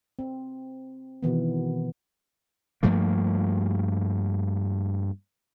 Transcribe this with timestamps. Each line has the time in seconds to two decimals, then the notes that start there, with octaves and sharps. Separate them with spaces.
0.19 C4
1.23 B2 D#3 E3 B3
2.83 G2 F3 A3 A#3